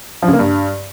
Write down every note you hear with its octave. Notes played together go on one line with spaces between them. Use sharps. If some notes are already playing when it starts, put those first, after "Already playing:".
F3
C#3
A#3
G2